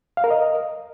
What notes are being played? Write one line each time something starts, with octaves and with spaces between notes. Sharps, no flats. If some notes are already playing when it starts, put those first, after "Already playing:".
F5
A#4
D#5